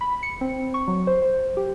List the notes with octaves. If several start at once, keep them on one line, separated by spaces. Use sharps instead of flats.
B5
C#7
C4
C#6
F#3
C5
C5
G4